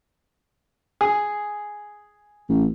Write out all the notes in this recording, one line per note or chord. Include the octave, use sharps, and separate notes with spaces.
G#4
A1